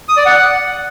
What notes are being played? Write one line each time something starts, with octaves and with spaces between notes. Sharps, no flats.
D#6
D5
F#5